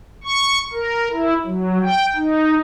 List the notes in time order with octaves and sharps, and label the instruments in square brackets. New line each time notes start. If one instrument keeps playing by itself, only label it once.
[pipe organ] C#6
A#4
E4
F#3
G5
D#4